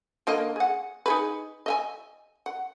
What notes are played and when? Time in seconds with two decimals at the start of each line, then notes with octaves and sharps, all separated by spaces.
0.27 D3 A#3 D#5
0.56 G#4 F#5
1.06 D#4 G#4 B4
1.66 D#5 E5 G#5
2.46 F#5